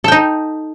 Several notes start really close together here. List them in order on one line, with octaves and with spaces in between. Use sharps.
A4 G5 D#4